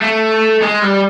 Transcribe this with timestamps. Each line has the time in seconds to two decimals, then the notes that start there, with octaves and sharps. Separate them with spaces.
0.02 A3
0.62 G#3
0.82 G3